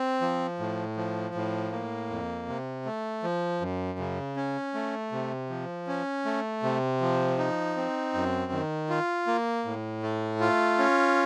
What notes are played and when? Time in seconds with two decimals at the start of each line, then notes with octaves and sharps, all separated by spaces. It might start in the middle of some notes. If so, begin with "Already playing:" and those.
Already playing: C4
0.21 F3
0.59 A2
0.97 F3
1.34 A2
1.72 A#3
2.10 F2
2.48 C3
2.85 A3
3.23 F3
3.61 F#2
3.99 C#3
4.37 C#4
4.74 A3
5.12 C3
5.49 F3
5.87 C#4
6.25 A3
6.63 C3
7.01 F3
7.38 D#4
7.76 C4
8.14 F#2
8.52 D#3
8.89 F4
9.27 A#3
9.65 A2
10.03 A3
10.40 F4
10.78 C#4